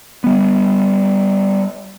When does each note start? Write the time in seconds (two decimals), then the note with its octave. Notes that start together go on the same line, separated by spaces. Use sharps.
0.24 G3 B3